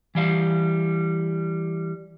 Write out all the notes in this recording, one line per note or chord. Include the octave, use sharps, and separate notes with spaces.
E3 G3 F5